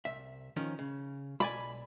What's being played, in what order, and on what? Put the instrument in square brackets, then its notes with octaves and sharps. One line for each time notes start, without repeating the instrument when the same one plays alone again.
[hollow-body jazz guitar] C2 E5
D#3 F3 C#4
C#3
[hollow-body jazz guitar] B1 D5 G#5 [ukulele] B5